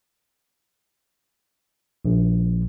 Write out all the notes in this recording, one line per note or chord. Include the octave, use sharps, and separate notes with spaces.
A#1